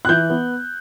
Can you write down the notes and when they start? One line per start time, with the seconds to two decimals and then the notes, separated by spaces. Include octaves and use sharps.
0.05 F#6
0.09 E3 G6
0.30 B3